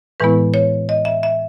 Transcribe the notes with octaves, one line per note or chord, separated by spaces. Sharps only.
A2 E3 G#3 B3 E4 B4
C#5
D#5
E5
E5